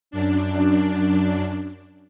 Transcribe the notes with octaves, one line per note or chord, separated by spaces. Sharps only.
F#2 D4